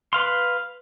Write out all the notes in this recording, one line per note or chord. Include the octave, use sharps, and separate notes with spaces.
B4 F5 C6